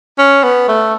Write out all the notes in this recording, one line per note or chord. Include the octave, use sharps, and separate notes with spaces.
C#4
B3
A3